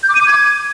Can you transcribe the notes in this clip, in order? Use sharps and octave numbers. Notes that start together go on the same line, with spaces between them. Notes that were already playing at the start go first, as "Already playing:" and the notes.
G6
D6
D#7
D6
G#6